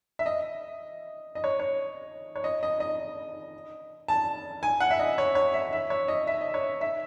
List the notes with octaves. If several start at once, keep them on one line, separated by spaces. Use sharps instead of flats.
E5
D#5
D#5
C#5
C#5
C#5
D#5
D#5
D#5
A5
G#5
F#5
E5
D#5
C#5
C#5
E5
E5
C#5
D#5
E5
D#5
C#5
E5